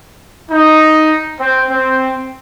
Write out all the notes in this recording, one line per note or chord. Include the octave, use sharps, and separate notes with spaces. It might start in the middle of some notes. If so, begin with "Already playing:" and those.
D#4
C4
C4